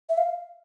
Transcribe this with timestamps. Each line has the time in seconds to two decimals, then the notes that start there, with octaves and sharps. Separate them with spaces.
0.09 E5
0.17 F5